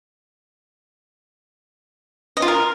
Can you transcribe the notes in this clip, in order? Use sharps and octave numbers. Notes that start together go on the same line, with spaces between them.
D#5
F4
A#4